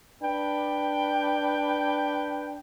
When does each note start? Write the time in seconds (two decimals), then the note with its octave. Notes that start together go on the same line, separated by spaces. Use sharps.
0.22 D4 B4 G5